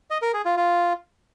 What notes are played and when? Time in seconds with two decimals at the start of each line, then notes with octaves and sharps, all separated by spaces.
0.11 D#5
0.22 A#4
0.34 G#4
0.45 F4
0.57 F4